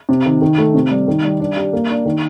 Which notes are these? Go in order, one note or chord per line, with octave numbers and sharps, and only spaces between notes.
C3
D#3
D#3
A3
C3
G3
D#3
G3
D4
G4
A#3
D4
D#3